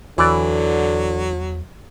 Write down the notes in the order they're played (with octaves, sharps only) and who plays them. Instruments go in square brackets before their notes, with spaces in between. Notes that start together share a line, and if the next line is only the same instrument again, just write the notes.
[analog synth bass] E2 [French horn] D3 [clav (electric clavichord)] E3 D5 [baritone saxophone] F#3